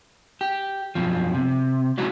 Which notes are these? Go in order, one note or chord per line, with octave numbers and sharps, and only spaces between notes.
G4
F#2 B2 F3
C3
F#3 G#3 D#4 E4 F#4